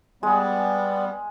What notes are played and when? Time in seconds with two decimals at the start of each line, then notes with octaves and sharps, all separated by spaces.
0.23 G3 G#3 B3